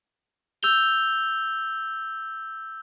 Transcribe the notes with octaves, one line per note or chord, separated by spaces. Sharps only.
E6 G6 F7 G7